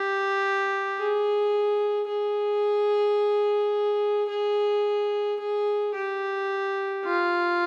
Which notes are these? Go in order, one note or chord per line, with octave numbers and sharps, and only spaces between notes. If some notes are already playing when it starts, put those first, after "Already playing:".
Already playing: G4
G#4
G#4
G#4
G#4
G4
F4